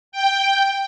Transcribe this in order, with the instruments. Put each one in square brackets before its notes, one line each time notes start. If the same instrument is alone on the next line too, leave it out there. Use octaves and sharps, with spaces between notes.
[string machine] G5